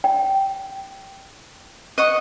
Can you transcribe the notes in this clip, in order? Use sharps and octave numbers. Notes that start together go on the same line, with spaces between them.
G5
D#5 F#5 C#6